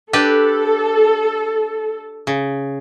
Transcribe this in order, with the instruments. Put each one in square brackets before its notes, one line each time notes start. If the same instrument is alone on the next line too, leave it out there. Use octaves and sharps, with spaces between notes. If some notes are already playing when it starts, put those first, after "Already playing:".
[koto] D4 G4 B4 [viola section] A4
[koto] C#3